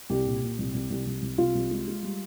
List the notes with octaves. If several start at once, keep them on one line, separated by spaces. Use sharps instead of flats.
C2 G4
A#2
A#2
C2
C2
C2
C2
C2
C2 F4
C2
G#3
G#3
G3